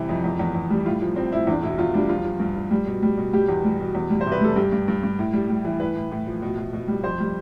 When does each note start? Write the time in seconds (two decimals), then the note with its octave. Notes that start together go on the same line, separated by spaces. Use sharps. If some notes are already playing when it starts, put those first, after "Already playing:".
Already playing: C3 E3 G3 G4
0.09 F2
0.24 E2
0.39 E2
0.55 E2
0.70 G3
0.86 A2 F4
1.02 F3
1.16 F3 C4
1.32 A2 E4
1.47 E2 D4
1.63 B2 E4
1.78 E2 F4
1.94 G3 D4
2.09 F3 F4
2.24 F3
2.40 G2
2.56 F3
2.71 G3
2.86 B2
3.02 G3
3.18 B2
3.33 G3 G4
3.49 E2
3.65 G3
3.80 B2
3.95 E2
4.10 G3
4.21 C5
4.26 C3
4.32 B4
4.41 G3 A4
4.56 G2 G4
4.72 G2
4.88 G2
5.04 G2
5.19 A2
5.33 G3
5.50 G3
5.65 E3
5.80 A2 B4
5.96 A2
6.11 A2
6.27 F3
6.42 B2
6.58 B2
6.73 B2
6.88 G3
7.04 F2 C5
7.20 G3